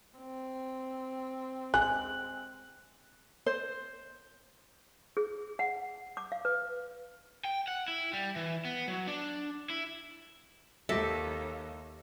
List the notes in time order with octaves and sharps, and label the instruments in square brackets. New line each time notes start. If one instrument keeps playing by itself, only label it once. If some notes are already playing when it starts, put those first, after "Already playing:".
[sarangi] C4
[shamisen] G#3 [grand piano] F#6
[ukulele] C5
[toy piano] G#4
F#5
D6
F5
B4
[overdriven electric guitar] G5
F#5
E4
G3
E3
B3
F#3
D4
E4
[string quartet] D#2 [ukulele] G4 D#5 E5 [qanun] A4